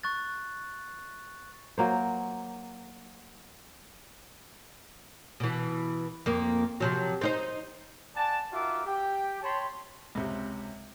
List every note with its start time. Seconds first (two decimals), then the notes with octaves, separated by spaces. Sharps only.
0.03 C#6 F#6 A6
1.78 F#3 A#3 C5
5.40 B2 E3
6.26 F2 A#3
6.80 C3 F3 F#3
7.21 C4 D#4 C5
8.16 D5 F#5 G#5 A5
8.53 D#4 F4 F#4 A#4 E5 D6
8.85 G4 G5
9.43 C#5 G5 A5 B5 C6
10.15 C#2 C3